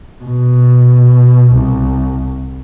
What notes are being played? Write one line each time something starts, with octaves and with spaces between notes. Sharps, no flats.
B2
C2